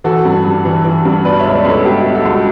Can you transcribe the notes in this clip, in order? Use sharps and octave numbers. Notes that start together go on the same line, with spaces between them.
E3 F#4 A4
G2
G2
E3
E3
G2
B2 B4 D5
C#5 E5
C#2
B4 D5
C#2
A4 C#5
B2 G4 B4
B2
F#4 A4
C#2